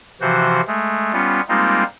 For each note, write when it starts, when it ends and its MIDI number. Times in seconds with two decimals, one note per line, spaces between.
0.21 0.61 48
0.21 0.61 52
0.21 0.61 53
0.21 0.61 66
0.21 0.61 72
0.67 1.12 56
0.67 1.12 57
1.13 1.41 55
1.13 1.41 59
1.13 1.41 61
1.13 1.41 65
1.49 1.84 55
1.49 1.84 56
1.49 1.84 58
1.49 1.84 60
1.49 1.84 63
1.49 1.84 65